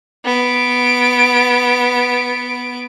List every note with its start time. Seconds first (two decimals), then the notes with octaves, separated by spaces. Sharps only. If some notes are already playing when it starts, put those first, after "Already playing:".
0.25 B3 D7